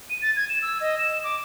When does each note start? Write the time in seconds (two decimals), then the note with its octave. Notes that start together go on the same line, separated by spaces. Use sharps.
0.10 D#7
0.22 A6
0.36 G#6
0.50 E7
0.62 E6
0.81 D#5
0.99 E7
1.24 D6